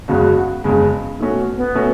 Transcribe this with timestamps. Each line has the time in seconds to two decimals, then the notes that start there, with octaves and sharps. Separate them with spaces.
0.08 F#1 E2 C#3 G#3 F#4
0.64 F#1 E2 C#3 G#3
1.19 B2 A3 C#4 D#4 F#4
1.38 B3
1.57 B3
1.74 B2 A3 C#4 F#4